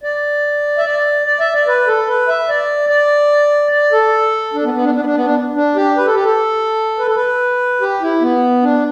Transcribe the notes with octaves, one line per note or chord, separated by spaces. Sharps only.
D5
E5
D5
D5
E5
D5
B4
A4
B4
E5
D5
D5
D5
A4
D4
B3
B3
D4
D4
B3
D4
B3
D4
D4
G4
B4
A4
G4
A4
B4
A4
B4
G4
E4
B3
D4